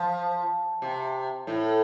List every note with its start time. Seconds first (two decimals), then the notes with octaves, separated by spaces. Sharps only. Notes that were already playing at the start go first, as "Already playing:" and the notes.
Already playing: F3
0.82 C3
1.47 A2